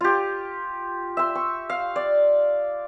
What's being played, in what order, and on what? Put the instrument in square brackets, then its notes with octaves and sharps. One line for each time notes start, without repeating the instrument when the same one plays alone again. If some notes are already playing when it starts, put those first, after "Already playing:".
[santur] F4 G4
E5 C6
C#6
F5
D5